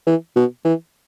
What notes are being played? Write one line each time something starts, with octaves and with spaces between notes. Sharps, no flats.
E3
B2
E3